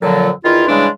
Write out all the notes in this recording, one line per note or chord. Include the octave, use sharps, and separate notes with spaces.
F2 A#2 D3 F3 F#3
E2 D#3 E4 F4
C#3 E3 G3 G#3 D4